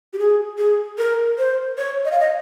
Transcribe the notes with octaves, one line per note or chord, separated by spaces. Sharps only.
G4
G#4
G#4
A#4
C5
C#5
D#5
F5
D#5